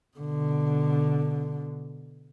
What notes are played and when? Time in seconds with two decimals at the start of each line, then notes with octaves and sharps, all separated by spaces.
0.17 B2 D3